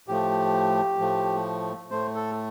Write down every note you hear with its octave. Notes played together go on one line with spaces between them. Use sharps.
A2 F3 A3 G4
A2 F3 A3
A2 A3 C5
A4